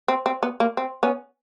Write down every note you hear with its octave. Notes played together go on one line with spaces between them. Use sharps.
C4
C4
B3
A#3
C4
B3 C#4